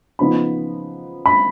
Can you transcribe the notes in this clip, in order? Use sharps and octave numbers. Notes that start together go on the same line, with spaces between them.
C#3 F3 B3 D#4 B5
B5